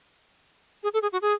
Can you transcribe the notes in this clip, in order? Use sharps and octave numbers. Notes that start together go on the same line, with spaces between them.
G#4
A4
G#4
F#4
G#4